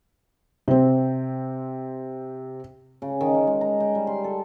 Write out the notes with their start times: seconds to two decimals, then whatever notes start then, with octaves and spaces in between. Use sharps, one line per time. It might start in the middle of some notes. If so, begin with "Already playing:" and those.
0.68 C3 C4
3.02 C#3
3.21 D#3
3.34 C#4
3.47 G#3
3.61 A#5
3.80 G5
3.95 G3
4.07 C6
4.24 A4